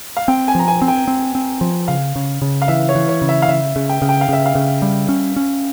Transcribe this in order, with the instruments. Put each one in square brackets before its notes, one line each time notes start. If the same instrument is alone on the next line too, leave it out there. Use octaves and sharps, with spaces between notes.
[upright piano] F5
[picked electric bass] C4 [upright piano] G5
[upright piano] G#5
[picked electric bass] F3 [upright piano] A#5
[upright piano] G#5
[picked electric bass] C4
[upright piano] G5
[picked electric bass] C4
C4
F3
[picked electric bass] C#3 [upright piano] F5
[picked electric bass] C#3
C#3
[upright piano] F5
[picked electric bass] E3 [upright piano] E5
[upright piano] C#5
[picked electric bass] E3
[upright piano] C#5
[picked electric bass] C#3
[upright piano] E5
F5
[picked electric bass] C#3 [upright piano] E5
[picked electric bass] C#3
[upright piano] G5
[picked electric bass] C#3
[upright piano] G5
F5
[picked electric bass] C#3 [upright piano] E5
[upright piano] F5
[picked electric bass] C#3
G3
C#4
C#4